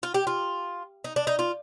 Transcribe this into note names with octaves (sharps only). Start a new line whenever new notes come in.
F4
G4
F4
D#4
D4
D#4
F4